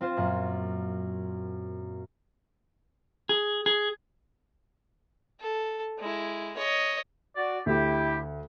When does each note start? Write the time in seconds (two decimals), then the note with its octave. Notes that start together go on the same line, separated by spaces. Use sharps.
0.01 C4 F4 C5
0.17 F#2 A#2
3.29 G#4
3.66 G#4
5.40 A4
5.99 G#3 E4
6.57 C#5 D#5
7.36 F#4 D5
7.66 D2 E4 G4